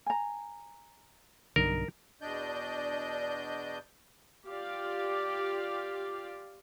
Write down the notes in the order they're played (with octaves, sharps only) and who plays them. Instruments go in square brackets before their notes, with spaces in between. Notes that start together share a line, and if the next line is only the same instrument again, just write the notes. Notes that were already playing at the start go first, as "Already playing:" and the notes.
[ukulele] G#5 A#5
[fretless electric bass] B1 G2 D3 [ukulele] D#4 [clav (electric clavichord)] A#4
[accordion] E2 B2 D4 D5 D#5 G6
[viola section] F4 G4 D5 F5